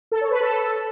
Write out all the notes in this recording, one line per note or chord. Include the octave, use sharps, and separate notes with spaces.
A4
C#5
B4
A4